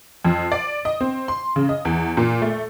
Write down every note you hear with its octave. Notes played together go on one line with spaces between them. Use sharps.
F2
D5
D#5
C4
C6
C#3
D#5
E2
A#2
A3